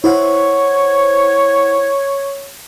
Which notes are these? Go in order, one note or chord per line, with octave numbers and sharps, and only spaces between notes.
E4 C5 C#5 F#5